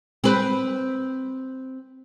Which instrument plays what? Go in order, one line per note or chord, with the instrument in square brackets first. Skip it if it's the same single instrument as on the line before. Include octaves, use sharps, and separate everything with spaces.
[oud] C4 B4